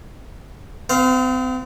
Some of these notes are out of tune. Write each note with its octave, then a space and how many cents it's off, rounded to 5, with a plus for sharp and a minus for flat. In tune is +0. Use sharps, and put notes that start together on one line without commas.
C4 -40 F5 +0